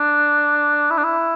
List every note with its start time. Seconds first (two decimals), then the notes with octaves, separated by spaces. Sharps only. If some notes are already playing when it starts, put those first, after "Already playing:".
Already playing: D4
0.91 E4
0.98 D4
1.04 E4